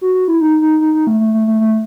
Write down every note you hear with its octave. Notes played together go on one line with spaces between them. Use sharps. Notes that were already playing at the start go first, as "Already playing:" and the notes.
F#4
F#4
E4
D#4
D#4
D#4
D#4
A3
A3
A3
A3
A3